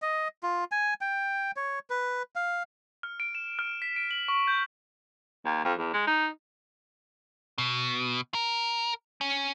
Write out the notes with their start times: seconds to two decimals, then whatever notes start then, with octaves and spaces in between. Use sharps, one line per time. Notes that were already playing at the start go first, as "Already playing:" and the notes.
0.02 D#5
0.43 F4
0.72 G#5
1.01 G5
1.56 C#5
1.90 B4
2.36 F5
3.03 F6
3.20 D7
3.35 E7
3.59 F6
3.82 B6
3.96 D7
4.11 F#7
4.28 C#6
4.47 G6
5.45 D#2
5.65 F2
5.79 E2
5.93 G#3
6.07 D#4
7.58 B2
8.34 A#4
9.21 C#4